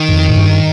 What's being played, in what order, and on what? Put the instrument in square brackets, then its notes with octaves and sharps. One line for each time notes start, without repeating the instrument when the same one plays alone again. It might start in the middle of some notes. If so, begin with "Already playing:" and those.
Already playing: [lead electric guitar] D#3
[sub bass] G2
F2
A2
G2